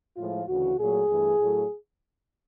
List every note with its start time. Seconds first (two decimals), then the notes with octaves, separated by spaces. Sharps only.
0.17 A2 F3 G#3 F4
0.48 D2 C#3 E3 F#4
0.78 A#2 F#3 A3 G#4
1.08 G2 E3 A3
1.40 A2 F#3 A3